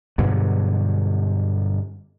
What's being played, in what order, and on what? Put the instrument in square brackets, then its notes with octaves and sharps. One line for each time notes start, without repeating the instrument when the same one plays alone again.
[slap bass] G2 B2 D3 F#3